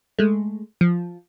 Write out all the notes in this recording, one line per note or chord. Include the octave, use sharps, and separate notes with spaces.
G#3 A3
F3